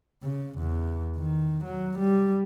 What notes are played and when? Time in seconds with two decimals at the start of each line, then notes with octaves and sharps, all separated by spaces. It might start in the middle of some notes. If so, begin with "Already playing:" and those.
0.22 C#3
0.59 E2
1.16 D#3
1.65 F#3
1.99 G3